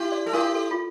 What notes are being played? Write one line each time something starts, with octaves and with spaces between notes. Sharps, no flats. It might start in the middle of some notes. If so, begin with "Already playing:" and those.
Already playing: E4 G4
D5
A4
E4 G4 A#4
A4
F4